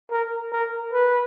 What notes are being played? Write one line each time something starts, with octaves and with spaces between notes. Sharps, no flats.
A#4
A#4
B4